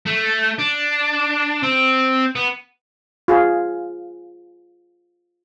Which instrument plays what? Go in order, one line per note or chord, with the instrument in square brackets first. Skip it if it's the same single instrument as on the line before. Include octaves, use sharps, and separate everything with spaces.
[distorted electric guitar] A3
D4
C4
B3
[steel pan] F4 G#4